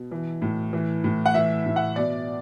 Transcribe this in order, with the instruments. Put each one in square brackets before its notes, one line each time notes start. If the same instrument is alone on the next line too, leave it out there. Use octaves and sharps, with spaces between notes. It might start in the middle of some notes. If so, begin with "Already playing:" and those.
Already playing: [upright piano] B2
E3
A2
E3
A2
F#5
E3 E5
A2
F#5
B2 D5